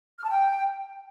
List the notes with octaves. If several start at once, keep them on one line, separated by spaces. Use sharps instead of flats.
F6
A5
G5